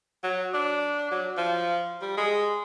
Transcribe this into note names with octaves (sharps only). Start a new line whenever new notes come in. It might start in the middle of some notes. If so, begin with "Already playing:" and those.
F#3
D4
F#3
F3
G3
G#3